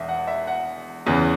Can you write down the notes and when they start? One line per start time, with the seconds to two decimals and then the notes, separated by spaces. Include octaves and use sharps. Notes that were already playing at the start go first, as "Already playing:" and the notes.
Already playing: E1 E2 E5
0.09 F#5
0.27 E5
0.47 F#5
1.06 E2 C#3 E3